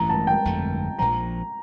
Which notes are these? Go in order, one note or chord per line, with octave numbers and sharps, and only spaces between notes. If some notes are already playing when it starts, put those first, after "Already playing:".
Already playing: A1 G2 E3 A3 A#5
A5
G5
G1 F2 D3 A3
A#1 A#2 F3 A#5